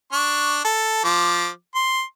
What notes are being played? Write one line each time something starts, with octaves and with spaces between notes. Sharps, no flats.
D4 C#6
A4
F3 D6
C6